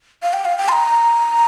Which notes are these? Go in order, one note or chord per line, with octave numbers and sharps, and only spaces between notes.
F5
G5
F5
G5
C6
A#5